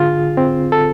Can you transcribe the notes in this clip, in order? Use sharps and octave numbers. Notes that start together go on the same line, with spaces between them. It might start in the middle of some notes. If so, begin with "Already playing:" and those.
Already playing: D3 F4 G#4
C4
A4